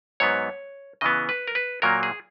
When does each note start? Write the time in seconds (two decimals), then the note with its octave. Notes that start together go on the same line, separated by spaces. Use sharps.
0.20 G#2 F#3 B3 C#5
1.01 C#3 E3 B3 D#5
1.29 B4
1.48 A#4
1.55 B4
1.82 A#2 F#3 A#3 A#4
2.03 G#4